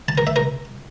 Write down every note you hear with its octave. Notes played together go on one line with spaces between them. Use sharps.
A5
A#4
E5
A#4